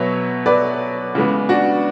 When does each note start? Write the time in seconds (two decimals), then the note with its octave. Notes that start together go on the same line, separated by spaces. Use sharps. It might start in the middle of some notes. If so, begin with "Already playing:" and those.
Already playing: B2 F#3 B3 C#5 E5
0.46 B4 D5
1.15 C#3 E3 G#3 B3
1.49 D4 F#4